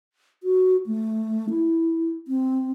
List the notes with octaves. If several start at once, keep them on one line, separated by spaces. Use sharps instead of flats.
F#4
A3
E4
C4